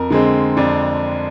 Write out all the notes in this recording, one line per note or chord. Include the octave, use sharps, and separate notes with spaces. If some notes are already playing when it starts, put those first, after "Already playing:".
Already playing: F2 A#4
D3 G#3 C4
F2 D4